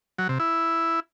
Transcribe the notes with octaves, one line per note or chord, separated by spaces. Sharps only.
F#3
C3
E4